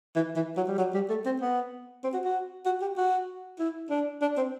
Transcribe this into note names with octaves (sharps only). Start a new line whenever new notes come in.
E3
E3
F#3
G3
F#3
G3
A3
C4
B3
C4
F#4
F#4
F#4
G4
F#4
E4
D4
D4
C4